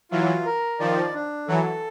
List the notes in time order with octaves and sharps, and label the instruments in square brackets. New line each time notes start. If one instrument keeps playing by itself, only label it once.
[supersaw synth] E3 F#3 [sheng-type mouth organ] F4
[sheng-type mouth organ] A#4
[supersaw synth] D#3 F3 [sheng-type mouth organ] D5
[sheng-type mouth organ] D4
[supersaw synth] E3 F#3 [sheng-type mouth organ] A4